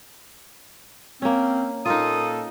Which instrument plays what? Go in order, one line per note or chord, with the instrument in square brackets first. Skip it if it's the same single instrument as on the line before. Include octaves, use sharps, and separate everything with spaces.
[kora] A#3 C#4 [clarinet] C4
[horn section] A#2 A#3 A4 [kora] D#4 F4 [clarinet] D#6